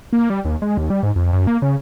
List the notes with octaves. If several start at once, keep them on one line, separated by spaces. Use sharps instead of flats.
A#3
G3
D#2
G#3
D#2
G3
G#2
F2
F#2
A#3
C#3